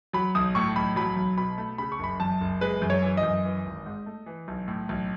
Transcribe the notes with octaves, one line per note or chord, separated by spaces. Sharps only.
F#3 B5
B1 D#6
A2 C#6
B1 B5
F#3 B5
B1
B2 B5
A3
C#3 B5
C#6
F#1 B5
F#2 A5
F#1
G#3 B4
F#2
C#5
E3
D#5
F#2
E3
G#1
G#2
A3
E3
B1
A2
B1